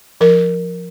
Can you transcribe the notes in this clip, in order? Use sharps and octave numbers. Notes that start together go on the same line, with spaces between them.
F3 A#4